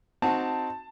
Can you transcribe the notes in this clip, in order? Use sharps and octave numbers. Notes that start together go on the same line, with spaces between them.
C4 D#4 F#4 A5